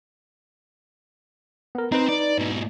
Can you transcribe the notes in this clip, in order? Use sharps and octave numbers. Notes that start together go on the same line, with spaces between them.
B3 A#4
C4 D#4 B4
D5
G#2 B2